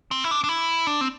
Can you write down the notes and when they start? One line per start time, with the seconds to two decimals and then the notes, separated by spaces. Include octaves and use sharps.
0.11 C4
0.24 E4
0.31 D4
0.44 D4
0.49 E4
0.87 D4
1.01 C4